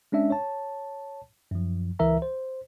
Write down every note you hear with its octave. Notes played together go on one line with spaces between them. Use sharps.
G#3 C#4 D4 E5
C#5 A5
F#2 F3
C#2 E3 A#4 E5 A#5
C5